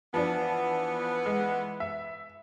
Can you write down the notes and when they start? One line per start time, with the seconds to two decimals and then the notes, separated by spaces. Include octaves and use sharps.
0.14 E3 F3 B3 D4
1.26 G#3
1.80 E5